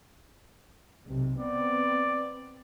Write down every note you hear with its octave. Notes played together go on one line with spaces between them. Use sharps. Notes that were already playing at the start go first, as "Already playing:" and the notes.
B1 C3
B3 C4 D5